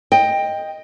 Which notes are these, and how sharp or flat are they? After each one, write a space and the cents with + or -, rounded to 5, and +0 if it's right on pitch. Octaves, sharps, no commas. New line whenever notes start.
D#5 +0 G5 +15